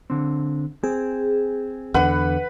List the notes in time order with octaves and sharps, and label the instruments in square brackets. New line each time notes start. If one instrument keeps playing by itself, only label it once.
[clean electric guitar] D3 C4
[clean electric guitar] C4 [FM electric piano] G#4
[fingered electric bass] E2 D3 [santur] B4 F#5